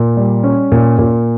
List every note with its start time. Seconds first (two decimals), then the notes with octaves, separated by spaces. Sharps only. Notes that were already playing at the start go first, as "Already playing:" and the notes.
Already playing: A#2
0.17 G3
0.44 C#4
0.72 A#2
0.99 A#2